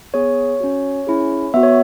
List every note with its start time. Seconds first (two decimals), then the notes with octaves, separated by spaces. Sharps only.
0.14 B3 G#4 C#5
0.60 C#4 F#4
1.07 C#4 E4 G#4
1.54 B3 F#4 E5
1.63 C#5